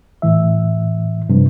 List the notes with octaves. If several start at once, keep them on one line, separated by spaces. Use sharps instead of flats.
A2 E3 E5
G2 C3 F3